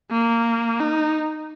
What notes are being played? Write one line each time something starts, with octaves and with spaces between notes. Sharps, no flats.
A#3
D#4